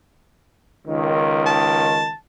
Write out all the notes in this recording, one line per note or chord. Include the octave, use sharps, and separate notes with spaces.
C#2 D#3
A5